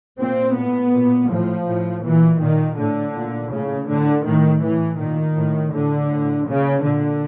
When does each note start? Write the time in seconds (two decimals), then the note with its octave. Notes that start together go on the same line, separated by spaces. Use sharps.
0.19 A#2 C4
0.56 A2 B3
0.93 A#2
1.30 A2 F3
1.67 A2
2.04 A#2 E3
2.41 A#2 D#3
2.78 A2 D3
3.15 A#2
3.52 A2 C#3
3.89 A2 D3
4.25 A2 D#3
4.62 A2 E3
4.99 A#2 D#3
5.37 A2
5.73 A2 D3
6.10 A2
6.48 A#2 C#3
6.84 A#2 D3